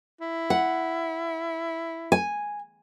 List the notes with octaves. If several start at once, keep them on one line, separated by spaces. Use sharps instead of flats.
E4
F#5
G#5